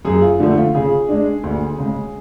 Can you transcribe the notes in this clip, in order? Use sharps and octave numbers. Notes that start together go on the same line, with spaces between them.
F#2 G#4
F4
D3 F3 A3
F4
C#3 G#4
G#3 D4
D2
C#3 G#3